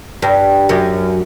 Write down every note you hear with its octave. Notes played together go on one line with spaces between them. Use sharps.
G2
F#2